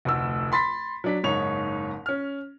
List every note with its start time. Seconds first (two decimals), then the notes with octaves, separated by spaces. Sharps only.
0.05 F1 D2 E6
0.52 B5 C6 A6 B6
1.04 F#3 D4 B6
1.24 F#1 G#2 D#4 C#5 F7
2.06 C#4 F6